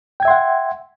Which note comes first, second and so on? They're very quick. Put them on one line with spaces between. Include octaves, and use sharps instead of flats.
G5 G#6 E5 C6 F#5